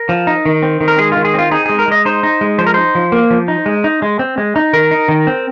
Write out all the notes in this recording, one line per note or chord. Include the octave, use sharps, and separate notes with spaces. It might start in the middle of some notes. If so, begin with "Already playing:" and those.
Already playing: A#4
F3
D#4
D#3
C4
D#3
A#4
G#3 G#4
F4
D#3
G#4
C4 F4
D#4 G#4
G#3 G#4
A#4
G#3 D#5
D#4 C5
D#4
G#3
F3 C5
A#4
D#4 C5
F3
A#3
F3
D#4
G#3
D#4
G#3
C4
G#3
D#4
D#3 A#4
D#4
D#3
C4